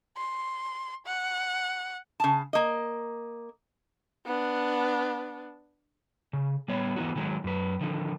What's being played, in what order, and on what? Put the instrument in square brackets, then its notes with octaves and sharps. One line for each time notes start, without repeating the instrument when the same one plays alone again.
[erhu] C6
F#5
[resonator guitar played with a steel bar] C#3 A5
A#3 D#5
[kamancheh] B3 D4
[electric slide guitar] C#3
G3 B3 C#5
E3 B3 D#4 F#4
D#3 F#3 G#3
F#2 B4
D3 D#3 F3